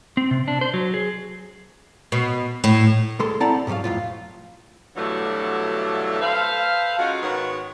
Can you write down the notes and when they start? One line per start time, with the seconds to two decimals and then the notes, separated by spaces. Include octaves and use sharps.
0.17 C4
0.31 C3
0.48 D4
0.61 C5
0.74 F#3
0.94 G#4
2.12 B2
2.64 A2
3.19 C2 G#3 A4 C6
3.40 C4 E4 D5 F#5 A5 A#5
3.67 G#2 C3 D#3 F#3 F5
3.84 F2 A2 F4
4.96 G2 B2 D3 E3 F#3 A3
6.21 A4 B4 C5 F5
6.99 G#3 C#4 D#4 F4 F#4
7.22 G#2 D#3 B3 F#4 C#5